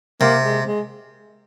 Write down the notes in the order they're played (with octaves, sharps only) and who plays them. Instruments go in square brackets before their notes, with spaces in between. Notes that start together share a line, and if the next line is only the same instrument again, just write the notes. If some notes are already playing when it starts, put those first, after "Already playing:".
[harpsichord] C3 [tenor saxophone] A#3
[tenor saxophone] G#3
G#3